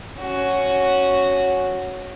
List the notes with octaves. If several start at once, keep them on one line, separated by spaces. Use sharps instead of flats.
C#4 F#4